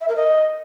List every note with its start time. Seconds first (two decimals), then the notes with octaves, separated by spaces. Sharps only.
0.01 E5
0.08 A#4
0.16 D#5